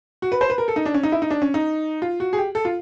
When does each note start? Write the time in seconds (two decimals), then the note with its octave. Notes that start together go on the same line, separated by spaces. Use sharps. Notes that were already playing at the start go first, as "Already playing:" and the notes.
0.22 F#4
0.32 B4
0.41 C5
0.50 B4
0.58 A#4
0.68 A4
0.76 D#4
0.86 D4
0.94 C#4
1.03 D#4
1.12 E4
1.22 D#4
1.31 D4
1.42 C#4
1.54 D#4
2.02 F4
2.20 F#4
2.33 G#4
2.38 G4
2.55 A4
2.65 F4